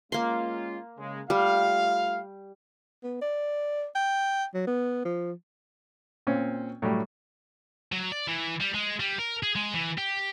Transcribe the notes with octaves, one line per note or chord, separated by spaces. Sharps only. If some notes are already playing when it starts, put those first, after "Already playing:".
G#3 A#3 C#4 F4 C6
C#3 G#3
G3 A3 F4 F5
B3
D5
G5
F#3
B3
F3
A#2 C4 C#4
A2 F#3 G3
F#3
D5
E3
G3
G#3
G3
A#4
G#4
G#3
E3
G4